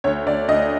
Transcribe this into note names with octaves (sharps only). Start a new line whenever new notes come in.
D2 C#5
D2 D5
D2 D#5